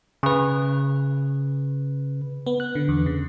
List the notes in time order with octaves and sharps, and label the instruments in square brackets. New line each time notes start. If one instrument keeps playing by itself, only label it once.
[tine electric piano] C#3 B4
[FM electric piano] B3
F#6
D3
E2
C#3